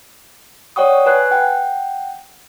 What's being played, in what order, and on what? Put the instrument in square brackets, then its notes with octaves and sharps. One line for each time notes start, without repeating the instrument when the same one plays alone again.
[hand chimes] C#5 D5 F#5 G5 C#6 D#6
B4 G#5 F#6
F#5 G5